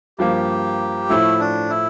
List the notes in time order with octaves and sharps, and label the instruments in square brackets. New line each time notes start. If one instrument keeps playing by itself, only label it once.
[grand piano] G2 F3 A#3 [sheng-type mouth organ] G4
[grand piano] A2 F3 A3 [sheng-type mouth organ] E4
[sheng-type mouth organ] D4
E4